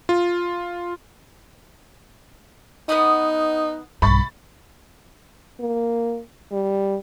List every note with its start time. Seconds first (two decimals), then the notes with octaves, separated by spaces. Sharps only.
0.09 F4
2.89 B3 D#4 B5 D#6
4.02 B1 G2 B5 C#6 A6
5.60 A#3
6.52 G3